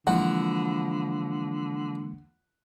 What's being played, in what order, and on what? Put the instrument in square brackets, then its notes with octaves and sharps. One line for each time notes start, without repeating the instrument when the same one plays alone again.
[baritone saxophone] D3 [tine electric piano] E3 G#3 A#3 [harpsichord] F3 E4 F#4 [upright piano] F#5